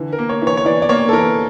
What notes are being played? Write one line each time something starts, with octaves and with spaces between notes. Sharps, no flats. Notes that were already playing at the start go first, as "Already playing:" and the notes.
Already playing: D3 E3
A#4
A#3
C#5
E3
C#5
C#5
E3 D5
D5
A#3 C#5
A4
E3 A#4